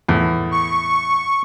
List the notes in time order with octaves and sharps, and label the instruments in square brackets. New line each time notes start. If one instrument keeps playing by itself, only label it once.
[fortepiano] E2 A2
[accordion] C#6